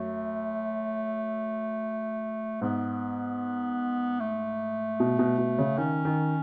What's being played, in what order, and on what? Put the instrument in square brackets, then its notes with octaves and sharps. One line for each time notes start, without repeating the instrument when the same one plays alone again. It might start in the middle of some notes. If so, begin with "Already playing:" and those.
Already playing: [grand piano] F#2 [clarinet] A3
[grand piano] G#2 [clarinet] B3
[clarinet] A3
[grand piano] B2
B2
B2
C#3
[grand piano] D#3 [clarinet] C#4
[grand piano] D#3